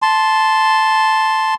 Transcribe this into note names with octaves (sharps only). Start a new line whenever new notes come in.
A5 C6